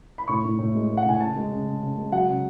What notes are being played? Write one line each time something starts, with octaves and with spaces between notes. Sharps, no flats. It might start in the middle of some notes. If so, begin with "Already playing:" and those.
B5
A2 C#6
A2
A2
G#3
G#3
F#5
A2 G#5
C#3 A5
G#3
C#3
C#3
C#3
G#3
F#3 F#5
C#3